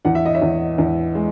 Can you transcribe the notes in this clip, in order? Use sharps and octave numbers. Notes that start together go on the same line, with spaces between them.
E2 F#5
E5
D#5
C#5 E5
E2
E2
G#3